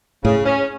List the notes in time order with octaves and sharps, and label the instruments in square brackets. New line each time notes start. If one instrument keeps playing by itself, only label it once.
[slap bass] A2 [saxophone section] C#3
[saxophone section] C#4